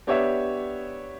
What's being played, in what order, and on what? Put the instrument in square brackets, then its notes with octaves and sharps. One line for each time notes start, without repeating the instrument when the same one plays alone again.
[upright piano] B3 D4 G4 C#5 E5